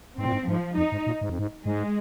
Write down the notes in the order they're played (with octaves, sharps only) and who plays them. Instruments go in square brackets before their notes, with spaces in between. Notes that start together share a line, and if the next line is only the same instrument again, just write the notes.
[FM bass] G#2 [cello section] C4
[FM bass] A#2
G#2
[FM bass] G#2 [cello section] F3
[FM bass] F2 [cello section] D#4
[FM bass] G#2
A#2
G#2
F2
G#2
[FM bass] G#2 [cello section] G#3